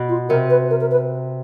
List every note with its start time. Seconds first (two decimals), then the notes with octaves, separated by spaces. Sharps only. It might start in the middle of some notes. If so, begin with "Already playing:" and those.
Already playing: B2
0.09 F4
0.29 C3 A#4
0.50 B4
0.70 A#4
0.81 A#4
0.91 B4